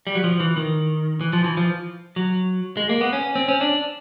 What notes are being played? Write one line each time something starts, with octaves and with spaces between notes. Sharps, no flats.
G3
F#3
F3
E3
D#3
E3
F3
E3
F3
F#3
G#3
A#3
B3
C#4
C4
C#4
D4